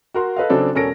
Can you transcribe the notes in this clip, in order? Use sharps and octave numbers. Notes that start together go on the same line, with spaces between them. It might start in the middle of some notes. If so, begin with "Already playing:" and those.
F#4 A#4 C6
A4 B4 D#5 F5
C#3 F#3 C4 D4 A4
E1 C#4 A4 A#4 A#6 D7